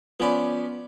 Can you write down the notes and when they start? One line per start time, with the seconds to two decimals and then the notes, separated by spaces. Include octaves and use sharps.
0.20 F3 B3 C#4 D5 B5